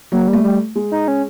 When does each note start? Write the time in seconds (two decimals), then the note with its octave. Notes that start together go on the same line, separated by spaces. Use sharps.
0.12 F#3 A#3
0.28 G3
0.33 A3
0.44 G3
0.75 G#3
0.92 D#4
1.08 C#4